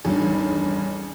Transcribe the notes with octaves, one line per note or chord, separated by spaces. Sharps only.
A1 E2 G2 D#3